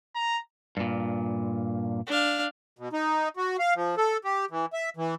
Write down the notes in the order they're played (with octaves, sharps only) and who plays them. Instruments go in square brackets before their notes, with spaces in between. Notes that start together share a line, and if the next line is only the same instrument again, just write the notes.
[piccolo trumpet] A#5
[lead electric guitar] G2 A#2
[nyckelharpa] D4 F5
[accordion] B2
D#4
F#4
F5
F3
A4
G4
E3
E5
E3